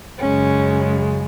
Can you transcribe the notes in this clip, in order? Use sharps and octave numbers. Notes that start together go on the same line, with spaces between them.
F#2 C#3 G#3 C#4